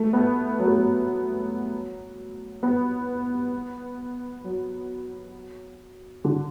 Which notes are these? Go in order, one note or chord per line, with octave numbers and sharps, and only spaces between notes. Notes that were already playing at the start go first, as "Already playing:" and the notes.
Already playing: A3
B3
F#3
A3
F#3
B3
F#3
D3